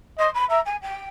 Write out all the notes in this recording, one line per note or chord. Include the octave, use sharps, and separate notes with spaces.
D#5 C6
B5
E5 A#5
G#5
G5